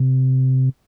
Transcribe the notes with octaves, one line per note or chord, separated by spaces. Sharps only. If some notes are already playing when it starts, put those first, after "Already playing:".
Already playing: C3